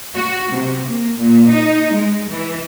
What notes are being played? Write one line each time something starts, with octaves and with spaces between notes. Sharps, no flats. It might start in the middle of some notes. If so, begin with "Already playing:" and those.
F#4
C3
A#3
A#2
D#4
G#3
E3